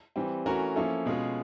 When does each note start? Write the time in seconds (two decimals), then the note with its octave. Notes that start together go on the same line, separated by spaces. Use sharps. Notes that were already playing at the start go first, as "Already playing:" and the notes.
0.16 E3 G3 C4
0.46 E3 A3 C#4 F#4 A#4
0.76 F3 A#3 C#4 E4 A4
1.06 B2 G#3 C#4 F4 G#4